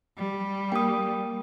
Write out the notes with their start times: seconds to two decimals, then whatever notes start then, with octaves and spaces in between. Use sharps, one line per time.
0.17 G3
0.72 A#3 G5 D#6